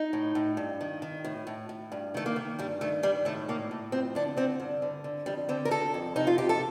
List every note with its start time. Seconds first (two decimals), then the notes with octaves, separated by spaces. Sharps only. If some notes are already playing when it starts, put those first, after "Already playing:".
Already playing: D#4
0.13 A2
0.35 A2
0.57 G2
0.81 D#3
1.02 D#3
1.24 A2
1.47 A2
1.69 A2
1.92 G2
2.14 D#3 A3
2.26 A#3
2.36 D#3
2.59 G2 G3
2.81 D#3 A3
3.03 D#3 G3
3.25 A2 A3
3.49 A2 A#3
3.71 A2
3.92 F2 C4
4.15 D3 D4
4.37 D3 C4
4.60 G2
4.82 D3
5.04 D3
5.26 F2 G3
5.49 D3 C4
5.65 A#4
5.71 D3 A4
5.94 F2
6.16 C3 D#4
6.27 F4
6.38 F2 G4
6.49 A4